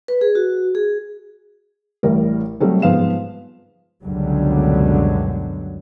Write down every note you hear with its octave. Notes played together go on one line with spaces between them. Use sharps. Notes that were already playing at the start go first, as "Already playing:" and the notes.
B4
G#4
F#4
G#4
A1 A2 G3 A#4
C3 F#3 G3 A3
G#2 F3 B3 F5 E7
C#2 F#2 B2 D3 F#3 G3